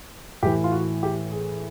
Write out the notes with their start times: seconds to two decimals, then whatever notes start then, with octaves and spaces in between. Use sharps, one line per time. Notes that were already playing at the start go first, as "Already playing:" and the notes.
0.43 A2 E3 G4
0.64 F4
0.72 F#4
1.03 G4
1.32 G#4